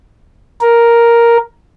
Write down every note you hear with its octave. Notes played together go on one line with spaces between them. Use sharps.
A#4